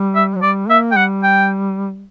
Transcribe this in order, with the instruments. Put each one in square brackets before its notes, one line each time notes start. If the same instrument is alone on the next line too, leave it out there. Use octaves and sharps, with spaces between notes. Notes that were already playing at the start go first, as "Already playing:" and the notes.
Already playing: [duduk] G3
[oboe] E5
[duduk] F#3
[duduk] G3 [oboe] D5
[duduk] A#3 [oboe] E5
[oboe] G5
[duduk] G3 [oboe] F#5
[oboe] G5